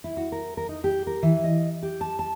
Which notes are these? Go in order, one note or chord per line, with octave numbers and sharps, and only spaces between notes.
E4
F#4
A#4
A#4
D#4
G4
A#4
E3
D#5
G4
A5
A5